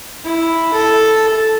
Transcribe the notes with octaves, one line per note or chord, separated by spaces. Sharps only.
E4
A4